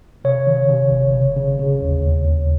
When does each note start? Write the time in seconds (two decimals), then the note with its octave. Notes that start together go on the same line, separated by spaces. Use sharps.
0.24 C3 C#5
0.47 D#3
0.69 C3
0.91 G1
1.14 C#3
1.37 C#3
1.59 C#3
1.81 D#2
2.03 D#2
2.26 D#2